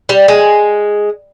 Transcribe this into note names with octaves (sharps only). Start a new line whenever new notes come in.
G3
G#3